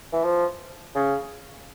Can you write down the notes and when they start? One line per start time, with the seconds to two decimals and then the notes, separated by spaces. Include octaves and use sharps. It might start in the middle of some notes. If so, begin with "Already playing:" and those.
0.13 E3
0.24 F3
0.95 C#3